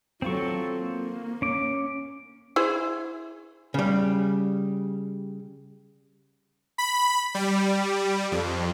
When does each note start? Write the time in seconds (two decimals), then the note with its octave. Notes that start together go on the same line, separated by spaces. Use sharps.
0.22 F#3 C4 F4 A4 C#6
0.79 A#3
1.42 C#4 D6
2.56 E4 G#4 C5
3.74 C#3 G3
6.78 B5
7.35 G3
8.32 F2